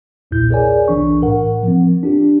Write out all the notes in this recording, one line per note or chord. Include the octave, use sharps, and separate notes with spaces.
B1 E2 A#2 E4 G6
G#4 A#4 C#5 D5 G#5
B1 E3 D4 C#6
A2 A#4 F#5
F3 C4
D4 F4 G4